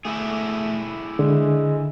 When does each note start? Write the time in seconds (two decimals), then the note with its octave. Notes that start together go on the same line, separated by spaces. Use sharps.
0.05 A3 E4 G4 G#4
1.19 D3 G#3